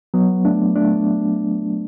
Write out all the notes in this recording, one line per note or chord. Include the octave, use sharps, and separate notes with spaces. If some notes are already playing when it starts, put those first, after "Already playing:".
F#3 B3
A3 D4
A3 D4